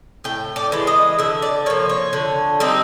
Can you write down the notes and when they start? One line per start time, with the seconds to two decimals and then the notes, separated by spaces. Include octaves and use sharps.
0.24 A2 G5
0.56 D5
0.72 E3 G#3
0.87 D#5
1.19 D3 E5
1.42 D5
1.66 A#3 C#5
1.70 F3
1.89 C#5
2.13 D3
2.60 G3 C4 D#4